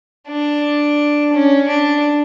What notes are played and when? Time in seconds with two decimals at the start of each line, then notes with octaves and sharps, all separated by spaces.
0.28 D4
1.33 C#4
1.68 D4